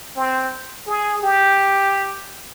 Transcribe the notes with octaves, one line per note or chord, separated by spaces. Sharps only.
C4
G#4
G4